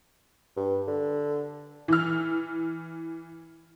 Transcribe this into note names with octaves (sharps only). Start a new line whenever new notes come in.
G2
D3
E3 F6